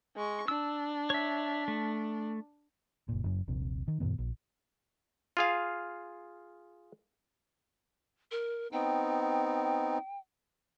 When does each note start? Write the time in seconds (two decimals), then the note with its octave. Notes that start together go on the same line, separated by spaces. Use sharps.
0.16 G#3 C#6
0.48 D4 E6
1.10 C#5 E5
1.68 A3
3.09 F#1 A#2
3.24 F#1 F#2
3.47 D#1 A#1 C3
3.88 D#3
4.00 F#2 A#2 D#3 B3
4.19 A#1
5.37 F4 G#4 F5
8.31 A#4
8.72 B3 C4 D#4 G5